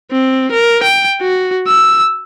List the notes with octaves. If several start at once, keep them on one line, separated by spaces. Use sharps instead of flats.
C4
A#4
G5
F#4
E6